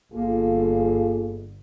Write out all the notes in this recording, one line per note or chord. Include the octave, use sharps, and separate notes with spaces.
G1 A#3 F4 G#4 A4